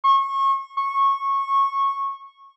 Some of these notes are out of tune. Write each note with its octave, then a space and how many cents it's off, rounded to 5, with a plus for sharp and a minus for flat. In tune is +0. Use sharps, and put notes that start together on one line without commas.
C#6 -30
C#6 -15